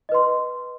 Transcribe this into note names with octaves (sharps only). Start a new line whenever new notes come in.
B4 D#5 C6